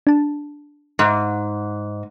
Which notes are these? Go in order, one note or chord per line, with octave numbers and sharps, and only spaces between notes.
D4 A5
G#2